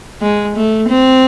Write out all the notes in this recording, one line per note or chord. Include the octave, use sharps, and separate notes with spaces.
G#3
A3
C4